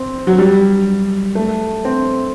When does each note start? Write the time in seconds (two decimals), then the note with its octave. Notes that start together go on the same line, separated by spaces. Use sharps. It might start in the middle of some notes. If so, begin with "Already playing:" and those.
Already playing: C4
0.27 F#3
0.38 G3
1.35 A3
1.85 C4